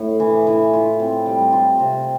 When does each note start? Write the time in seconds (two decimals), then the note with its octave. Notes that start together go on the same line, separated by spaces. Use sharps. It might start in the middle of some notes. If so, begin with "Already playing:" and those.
Already playing: A2
0.20 E3
0.47 E3
0.73 F4
1.00 C4
1.26 G3
1.53 F4
1.79 C3